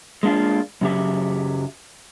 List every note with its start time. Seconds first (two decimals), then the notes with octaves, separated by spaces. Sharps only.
0.23 G#3 A#3 D4 D#4 F4
0.81 F#2 C#3 F#3 G4 E5